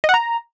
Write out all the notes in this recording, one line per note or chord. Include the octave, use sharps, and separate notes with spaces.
D#5
F#5
A#5